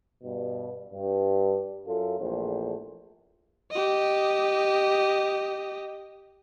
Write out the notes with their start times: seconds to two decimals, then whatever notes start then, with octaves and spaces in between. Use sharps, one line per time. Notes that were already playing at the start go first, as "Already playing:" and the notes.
0.23 G2 B2
0.91 G2
1.87 F#2 F4 A4
2.20 A#1 E2 A3 C5
3.71 G4 D#5